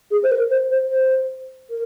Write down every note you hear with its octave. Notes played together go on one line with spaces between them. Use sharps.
G#4
C5
A#4
C5
C5
C5
A#4